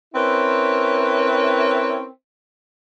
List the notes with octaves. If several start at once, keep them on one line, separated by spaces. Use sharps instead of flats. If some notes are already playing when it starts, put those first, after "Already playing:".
C4 C#4 E4 A#4 B4